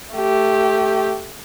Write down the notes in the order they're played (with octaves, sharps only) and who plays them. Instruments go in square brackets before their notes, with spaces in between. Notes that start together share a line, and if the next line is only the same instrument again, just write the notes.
[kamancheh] A3 G4